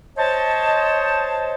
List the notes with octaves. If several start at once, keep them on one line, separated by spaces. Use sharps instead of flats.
C5 C#5 D#5 A5